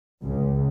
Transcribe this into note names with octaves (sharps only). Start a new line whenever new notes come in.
C#2